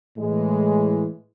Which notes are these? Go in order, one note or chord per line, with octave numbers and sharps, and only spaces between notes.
A2 E3 G#3